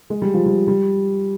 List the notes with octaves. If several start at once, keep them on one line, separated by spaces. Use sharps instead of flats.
G#3
G3
F3
G3
G3